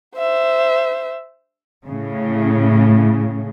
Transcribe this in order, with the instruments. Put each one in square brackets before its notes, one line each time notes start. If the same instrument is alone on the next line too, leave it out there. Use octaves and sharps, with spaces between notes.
[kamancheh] C5 E5
[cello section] A2 C#3